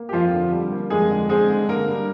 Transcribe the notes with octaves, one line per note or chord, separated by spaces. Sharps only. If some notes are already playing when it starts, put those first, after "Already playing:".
Already playing: A#3
G4
F2 F3 F4
D3
G3
A#3
F2 G#3 G#4
D3
G#3 C4 G#4
D3
D3 A#3 A#4
G3